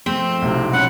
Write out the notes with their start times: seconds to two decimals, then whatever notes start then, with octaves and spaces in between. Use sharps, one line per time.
0.06 F3 A3 C4
0.42 B1 A2 C3
0.73 C#4 D4 F#5 B5